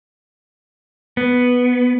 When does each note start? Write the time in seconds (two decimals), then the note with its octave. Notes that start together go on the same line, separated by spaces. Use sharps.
1.17 B3